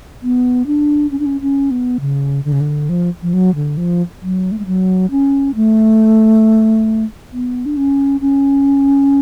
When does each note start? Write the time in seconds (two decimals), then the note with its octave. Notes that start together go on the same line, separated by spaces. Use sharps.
0.23 B3
0.67 D4
1.11 C#4
1.19 D4
1.26 C#4
1.41 C#4
1.71 B3
2.01 C#3
2.45 D3
2.52 C#3
2.61 D3
2.89 F3
3.22 F3
3.34 F#3
3.55 D3
3.77 F3
4.22 F#3
4.52 A3
4.59 G#3
4.66 F#3
5.11 C#4
5.55 A3
7.32 B3
7.66 D4
7.77 C#4
8.21 C#4